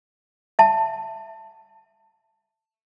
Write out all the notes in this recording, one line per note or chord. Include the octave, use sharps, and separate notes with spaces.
E5 A5